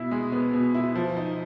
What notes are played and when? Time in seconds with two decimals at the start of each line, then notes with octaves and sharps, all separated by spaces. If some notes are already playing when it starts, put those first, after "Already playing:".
Already playing: B2 E4
0.11 G#3
0.32 B3
0.54 B2
0.74 E4
0.95 F3
1.17 D#4